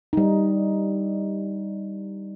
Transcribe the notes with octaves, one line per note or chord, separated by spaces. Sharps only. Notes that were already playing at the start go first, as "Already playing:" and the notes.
G3 D#4